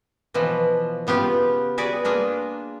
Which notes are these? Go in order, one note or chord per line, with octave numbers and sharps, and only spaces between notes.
B2 E3 F3
C#3 B3 F4 G4
F#4 G#4 B4 D5
A#3 D4 F4 G#4